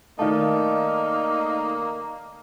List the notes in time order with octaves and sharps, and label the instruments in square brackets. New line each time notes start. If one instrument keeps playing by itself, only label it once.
[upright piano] D#3 A3 [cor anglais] A#3 [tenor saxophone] D#4 [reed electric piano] D5 F5 A5